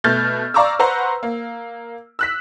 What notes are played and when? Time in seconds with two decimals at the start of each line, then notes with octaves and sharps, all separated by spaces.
0.04 B2 A3 F6 G6 A6
0.54 D5 F5 A#5 C#6 D6 E6
0.79 B4 C5 F#5 A#5 C6 C#6
1.23 A#3
2.19 E6 F#6 B6